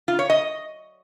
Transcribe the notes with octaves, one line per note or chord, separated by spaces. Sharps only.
F4
C#5
D#5